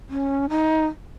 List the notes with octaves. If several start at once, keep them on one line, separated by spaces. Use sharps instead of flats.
C#4
D#4